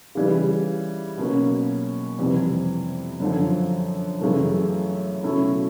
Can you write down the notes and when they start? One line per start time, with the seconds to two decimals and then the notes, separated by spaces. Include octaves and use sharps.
0.15 C#3 E3 G3
1.17 B2 F#3 A#3 C#4
2.19 F2 C3 E3 G3 C4
3.20 F#2 D3 F3
4.21 F#2 C#3 E3 A3
5.23 B2 F#3 A3 C#4 E4